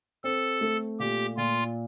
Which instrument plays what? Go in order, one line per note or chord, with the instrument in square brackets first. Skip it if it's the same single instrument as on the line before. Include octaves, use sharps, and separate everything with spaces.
[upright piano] C4 [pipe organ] A4
[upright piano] A3
[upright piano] A#2 [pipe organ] G4
[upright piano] A#2 [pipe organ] F4